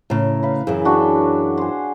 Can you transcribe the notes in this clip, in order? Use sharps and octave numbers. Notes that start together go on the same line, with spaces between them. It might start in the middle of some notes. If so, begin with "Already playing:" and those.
A2 C#3 A#4
B4 F5
F#2 C#3 E3
D4 F#4 G5
G#4 C5